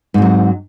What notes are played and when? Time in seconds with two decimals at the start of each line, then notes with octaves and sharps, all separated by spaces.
0.14 G#2
0.18 C4
0.22 F#3